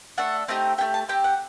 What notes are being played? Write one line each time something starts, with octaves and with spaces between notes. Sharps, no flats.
A3 D4 A4 F#5
A3 C4 D#4 G4
A3 D4 G4 G5
A5
C4 G4 G5
F#5